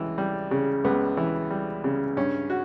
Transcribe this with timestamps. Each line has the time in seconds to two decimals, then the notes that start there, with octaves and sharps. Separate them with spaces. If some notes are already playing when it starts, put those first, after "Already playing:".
Already playing: C#2 E3
0.18 G3
0.51 C#3
0.84 C#2 B3
1.17 E3
1.50 G3
1.84 C#3
2.17 G2 C#4
2.50 F#4